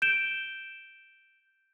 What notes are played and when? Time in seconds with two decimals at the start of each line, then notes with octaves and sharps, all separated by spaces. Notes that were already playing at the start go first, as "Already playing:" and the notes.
0.02 G6 D7 E7 G7